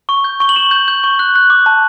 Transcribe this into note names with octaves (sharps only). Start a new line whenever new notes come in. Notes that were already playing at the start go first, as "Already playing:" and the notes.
C#6
G6
C#6 G7
F#7
C#6 E7
G6
G6
C#6
F#6
F#6
D6
A5